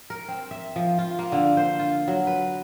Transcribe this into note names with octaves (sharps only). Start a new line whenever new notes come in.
A#4
C4
E5
F3
F4
A#3
D3
C5
F4
F#3
B4